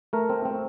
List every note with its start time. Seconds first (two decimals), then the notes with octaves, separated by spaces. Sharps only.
0.13 A3 A#4
0.30 C4
0.45 C4